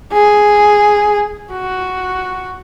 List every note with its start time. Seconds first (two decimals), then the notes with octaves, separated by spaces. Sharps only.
0.13 G#4
1.52 F#4